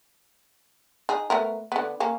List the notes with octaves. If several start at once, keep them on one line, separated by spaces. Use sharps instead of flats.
D#4 G#4
A3 B3 A#4
D3 B3
A#3 C#4